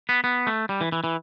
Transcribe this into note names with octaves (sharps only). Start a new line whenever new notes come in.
B3
B3
A3
G3
E3
E3
E3